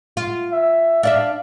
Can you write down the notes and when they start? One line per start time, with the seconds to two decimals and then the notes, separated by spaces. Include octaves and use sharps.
0.17 F4
0.52 E5
1.03 D4 D5 E5 F5